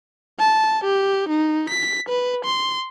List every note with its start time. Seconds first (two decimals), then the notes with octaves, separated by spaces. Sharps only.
0.40 A5
0.84 G4
1.29 D#4
1.69 B6
2.09 B4
2.45 C6